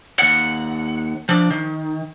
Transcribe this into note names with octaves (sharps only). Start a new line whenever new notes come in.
D#2 F#5
F3 D4
D#3